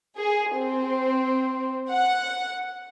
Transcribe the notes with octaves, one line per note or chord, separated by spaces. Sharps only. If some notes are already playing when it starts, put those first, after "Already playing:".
G#4
C4
F#5